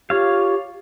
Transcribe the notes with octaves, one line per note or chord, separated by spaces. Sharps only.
F4 G4 C#5 F5